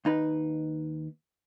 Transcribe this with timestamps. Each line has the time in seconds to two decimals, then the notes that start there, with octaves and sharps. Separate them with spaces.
0.05 D#2 D#4 B4